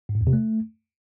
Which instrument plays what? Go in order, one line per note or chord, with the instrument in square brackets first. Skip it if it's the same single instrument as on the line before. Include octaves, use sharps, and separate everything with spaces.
[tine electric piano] G#2
A2
E2
C3
A3